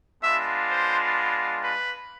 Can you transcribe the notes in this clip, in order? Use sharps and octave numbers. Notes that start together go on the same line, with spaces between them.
G#3 B3 D4 F4 E5
C5
B4